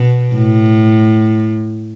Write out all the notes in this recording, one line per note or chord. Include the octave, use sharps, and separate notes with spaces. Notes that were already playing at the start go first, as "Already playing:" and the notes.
Already playing: B2
A2